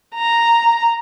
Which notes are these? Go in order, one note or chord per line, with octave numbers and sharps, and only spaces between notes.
A#5